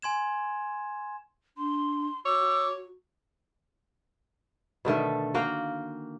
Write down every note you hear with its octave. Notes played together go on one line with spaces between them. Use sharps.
G#5 C6 G#6 E7
D4 C6
F#4 C#5 D6 E6
B2 D3 D#3 A3
A#3 F#4 F5 G5